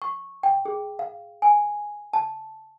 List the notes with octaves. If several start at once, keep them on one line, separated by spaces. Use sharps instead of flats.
C#6
G5
G#4
F5
G#5
A5